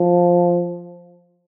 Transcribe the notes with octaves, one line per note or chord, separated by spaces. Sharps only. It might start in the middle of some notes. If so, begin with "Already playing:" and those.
Already playing: F3